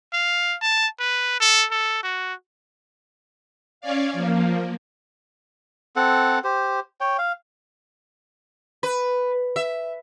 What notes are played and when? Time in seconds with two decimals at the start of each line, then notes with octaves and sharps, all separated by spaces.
0.13 F5
0.62 A5
1.00 B4
1.40 A4
1.71 A4
2.03 F#4
3.81 C#4 C#5 D5 F5
4.13 F3 A#3
5.96 C4 A4 F#5
6.44 G4 C5
7.01 C#5 G5
7.18 F5
8.83 B4
9.56 E5